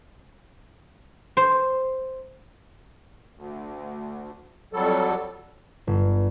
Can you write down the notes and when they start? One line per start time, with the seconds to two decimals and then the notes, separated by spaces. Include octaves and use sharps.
1.37 C5
3.36 D2
4.73 F2 F#3 G3 A4
5.87 G1